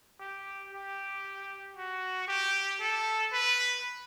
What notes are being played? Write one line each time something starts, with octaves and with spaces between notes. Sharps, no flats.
G4
G4
F#4
G4
A4
B4